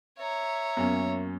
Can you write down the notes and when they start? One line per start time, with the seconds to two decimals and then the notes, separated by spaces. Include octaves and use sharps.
0.19 C#5 E5 A#5
0.77 F#2 A#3 B3 C#4